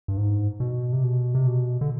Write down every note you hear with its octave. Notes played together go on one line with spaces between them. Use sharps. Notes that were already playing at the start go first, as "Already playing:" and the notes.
G2
G#2
B2
C3
B2
C3
B2
D3